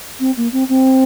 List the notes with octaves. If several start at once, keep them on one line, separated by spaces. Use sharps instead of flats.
C4
A#3
C4
C4